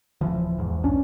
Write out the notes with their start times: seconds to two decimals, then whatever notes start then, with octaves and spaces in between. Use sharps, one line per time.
0.21 D1 G1 E3 F3
0.58 E2 G#2
0.83 B1 C#4 D4